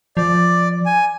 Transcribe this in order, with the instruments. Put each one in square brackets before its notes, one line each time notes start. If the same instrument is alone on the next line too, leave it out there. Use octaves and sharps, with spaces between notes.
[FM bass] F3 [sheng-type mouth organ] D5
[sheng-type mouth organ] G#5